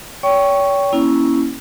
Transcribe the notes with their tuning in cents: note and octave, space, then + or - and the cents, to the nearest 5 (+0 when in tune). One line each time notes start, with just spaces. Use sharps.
C#5 +40 G5 +0 C#6 +0
A#3 +30 C#4 +0 E4 -5